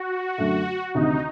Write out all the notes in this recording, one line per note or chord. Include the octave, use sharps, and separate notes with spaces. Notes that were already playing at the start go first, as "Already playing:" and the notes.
Already playing: F#4
F#2 D3 A3
D2 C3 D#3 D#4